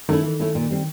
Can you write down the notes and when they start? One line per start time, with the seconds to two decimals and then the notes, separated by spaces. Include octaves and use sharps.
0.09 D#3 A3 C#4 E4
0.24 E3
0.40 A3 C#4 E4
0.55 A#2
0.70 G3 C4